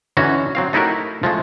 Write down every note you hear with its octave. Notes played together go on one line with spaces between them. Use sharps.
D3 E3 C#4 D#4 F#4
F#3 C4 F5
A3 D#4 E4 F#4 G4 A#4
F3 G#3 A3